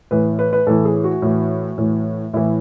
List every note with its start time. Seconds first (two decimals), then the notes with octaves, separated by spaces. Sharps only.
0.11 A2 E3 B4
0.39 B4
0.53 B4
0.67 A2 E3 A4
0.85 G#4
1.04 F#4
1.22 A2 E3
1.78 A2 E3
2.33 A2 E3 E4